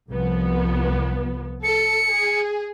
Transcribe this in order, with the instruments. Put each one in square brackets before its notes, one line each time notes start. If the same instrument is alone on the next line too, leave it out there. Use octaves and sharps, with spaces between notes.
[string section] C2 F3 B3
[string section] A4 [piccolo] C#7
[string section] G#4